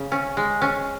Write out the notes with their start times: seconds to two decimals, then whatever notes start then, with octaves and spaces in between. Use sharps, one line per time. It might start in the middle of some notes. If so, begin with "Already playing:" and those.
Already playing: C#3
0.12 C#4
0.37 G#3
0.61 C#4